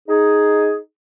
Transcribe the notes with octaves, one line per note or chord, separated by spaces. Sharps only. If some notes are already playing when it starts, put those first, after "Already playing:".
D#4 G#4